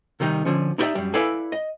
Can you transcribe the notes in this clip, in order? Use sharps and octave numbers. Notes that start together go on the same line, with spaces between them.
C3 D#3 G3 D#4
D3 F3 C#4
D#4 E4 G4 B4 D5 E5
F#2 G3
E4 A4 B4 D5 F5 G#5
D#5